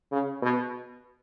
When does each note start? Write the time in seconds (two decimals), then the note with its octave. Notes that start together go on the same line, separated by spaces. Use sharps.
0.12 C#3
0.42 B2